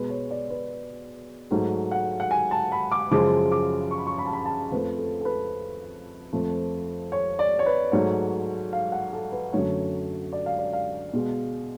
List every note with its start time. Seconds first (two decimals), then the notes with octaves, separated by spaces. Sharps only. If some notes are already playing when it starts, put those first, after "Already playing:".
Already playing: B2 G#3 B4
0.10 C#5
0.30 D5
0.50 B4
1.51 G#2 F#3 A3
1.91 F#5
2.20 F#5
2.31 G#5
2.51 A5
2.72 B5
2.92 D6
3.11 F#2 C#3 F3 G#3 D6
3.52 D6
3.91 C#6
3.98 B5
4.07 C#6
4.18 B5
4.26 A5
4.33 B5
4.46 A5
4.71 F2 F3 A3 B4
4.99 A4
5.21 A4
5.25 B4
6.33 F2 F3 A3
7.12 C#5
7.39 D5
7.59 C#5
7.66 B4
7.92 G#2 F#3 A3 C#5
8.73 F5
8.92 F#5
9.13 A4
9.32 B4
9.53 F#2 D3 F#3 A3 C#5
10.33 D5
10.46 F5
10.59 D5
10.73 F5
11.13 B2 G#3